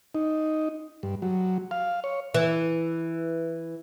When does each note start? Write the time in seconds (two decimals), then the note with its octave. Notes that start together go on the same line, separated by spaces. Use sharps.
0.15 D#4
1.03 G2
1.22 F#3
1.71 F5
2.04 C#5
2.34 E3